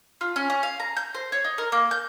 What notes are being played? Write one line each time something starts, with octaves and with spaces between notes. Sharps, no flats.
F4
C#4
C#4
F5
A#5
G6
C5
C#5
D#4
A#4
A#3
G6